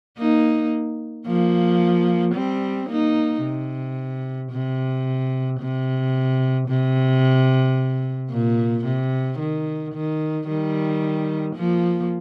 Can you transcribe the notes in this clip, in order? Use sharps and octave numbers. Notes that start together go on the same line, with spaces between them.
A#3 D#4
F3 A#3
G3 C4
A#3 D#4
C3
C3
C3
C3
A#2
C3
D#3
D#3
D#3 G3
F3 A#3